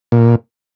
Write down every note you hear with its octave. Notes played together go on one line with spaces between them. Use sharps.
A#2